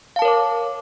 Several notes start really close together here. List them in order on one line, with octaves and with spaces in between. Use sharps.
F5 A5 A#4 C#5 D6